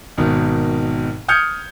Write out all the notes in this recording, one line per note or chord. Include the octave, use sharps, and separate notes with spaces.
G#1 B2 D#3
D#6 F6 G6 G#6 C#7